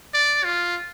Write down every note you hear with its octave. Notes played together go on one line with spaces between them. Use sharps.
D5
F4